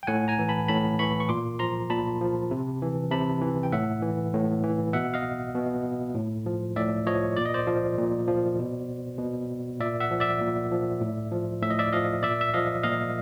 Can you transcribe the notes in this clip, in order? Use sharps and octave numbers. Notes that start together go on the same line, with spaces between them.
G5
A2 F#5 G#5
G#5 A#5
E3
A5 B5
A2 A5 B5
E3 B5 C#6
C#6
A#2 C6 D6
F3 A#5 C6
A#2 A5 B5
F3
C3
E3
C3 A5 B5
E3
G5
A2 E5 F#5
E3
A2
E3
B2 E5 F#5
D#5 F5
B2
A2
F3
A2 D5 E5
F3 C#5 D#5
A#2 D5
D#5
C5 D5
F3
A#2
F3
B2
B2
A#2 D5 E5
E5 F#5
F3
D5 E5
A#2
F3
A2
F3
A2 E5
D#5
D5 E5
F3 D#5 F5
A#2 D5 E5
E5
F3 D#5 F5
A#2 D#5 F5